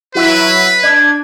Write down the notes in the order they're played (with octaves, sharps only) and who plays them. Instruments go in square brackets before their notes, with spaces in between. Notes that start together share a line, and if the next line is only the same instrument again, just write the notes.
[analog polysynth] F#3 E4 E5 [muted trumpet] B4
[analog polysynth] D4 [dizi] G#6